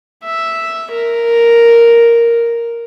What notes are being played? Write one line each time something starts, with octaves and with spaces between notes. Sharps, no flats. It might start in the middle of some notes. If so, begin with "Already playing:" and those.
E5
A#4